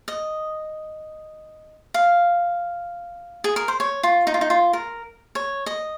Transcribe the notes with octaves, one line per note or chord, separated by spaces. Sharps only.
D#5
F5
G#4
A#4
C5
C#5
F4
D#4
F4
D#4
F4
A#4
C#5
D#5